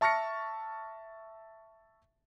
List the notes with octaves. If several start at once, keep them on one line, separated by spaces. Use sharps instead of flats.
E5 A5 C#6 F6 A#6 C#7